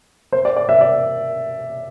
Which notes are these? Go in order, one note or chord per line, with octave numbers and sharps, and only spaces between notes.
C5
D5
D5
E5
D5